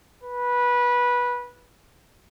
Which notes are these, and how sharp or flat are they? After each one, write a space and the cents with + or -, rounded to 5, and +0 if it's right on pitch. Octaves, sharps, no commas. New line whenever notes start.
B4 -15